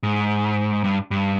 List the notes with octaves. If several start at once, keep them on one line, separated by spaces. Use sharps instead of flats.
G#2
G2
G2